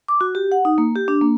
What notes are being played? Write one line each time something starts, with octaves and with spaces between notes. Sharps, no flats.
D6
F#4
G4
F#5
D#4
A#3
G4
D4
A#3